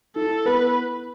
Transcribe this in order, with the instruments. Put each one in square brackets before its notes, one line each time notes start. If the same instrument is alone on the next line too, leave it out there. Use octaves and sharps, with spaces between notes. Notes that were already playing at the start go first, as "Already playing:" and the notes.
[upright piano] E4 [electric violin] A4
[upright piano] B3 [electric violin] B4